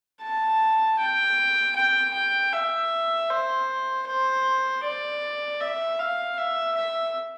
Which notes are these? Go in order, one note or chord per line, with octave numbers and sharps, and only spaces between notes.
A5
G5
G5
G5
E5
C5
C5
D5
E5
F5
E5
E5